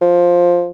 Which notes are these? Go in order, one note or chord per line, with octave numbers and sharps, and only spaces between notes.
F3